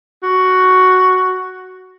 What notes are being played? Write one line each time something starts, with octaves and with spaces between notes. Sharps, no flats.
F#4